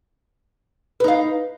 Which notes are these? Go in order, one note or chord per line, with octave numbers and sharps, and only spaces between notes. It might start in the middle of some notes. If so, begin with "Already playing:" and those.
D#4 B4 F5